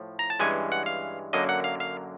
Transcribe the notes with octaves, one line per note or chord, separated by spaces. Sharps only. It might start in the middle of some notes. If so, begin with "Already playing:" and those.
Already playing: A2 F3
A#5
A5
G2 E3 G#3 C#4 G#5
F#5
F5
F#2 D3 F#3 A#3 D#5
F#5
F5
F5